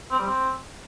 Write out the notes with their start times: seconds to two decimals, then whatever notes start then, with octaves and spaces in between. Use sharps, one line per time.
0.11 C4
0.19 G3
0.27 C4